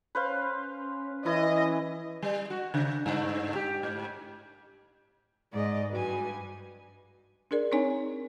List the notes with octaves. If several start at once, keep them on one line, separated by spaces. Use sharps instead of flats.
C#4 B4 C5 F5
E3 C#4 E4 D#5
G3
F#4
C#3
G2
G4
G#2
G#2 G#3 D5 D#5
G2 G3 F#4 B4 G#5
D4 G#4 A#4 D5
C4 D4 D#4 C#5 G#5